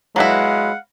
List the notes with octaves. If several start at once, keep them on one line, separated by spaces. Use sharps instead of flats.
F#3 G#3 B3 E4 F5 F#5